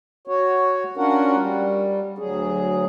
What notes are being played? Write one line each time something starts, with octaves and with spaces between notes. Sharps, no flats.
F#4 C#5
C#4 D4 F4 F#4 A#4 F#5
G3
D2 F#3 G#4